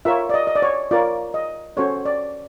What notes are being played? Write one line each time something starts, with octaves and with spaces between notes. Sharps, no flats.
F4 A#4 C#5 E5
D5
D#5
D#5
D5
C#5
F4 A#4 C#5 D5
D#5
C#4 F#4 A4 C5 C#5
D5